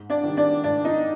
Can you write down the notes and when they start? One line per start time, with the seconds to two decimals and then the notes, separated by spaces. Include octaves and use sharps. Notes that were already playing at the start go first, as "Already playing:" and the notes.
Already playing: G#2
0.10 D4 D5
0.23 D#3 G3
0.37 D4 D5
0.64 G#2 D4 D5
0.84 D#4 D#5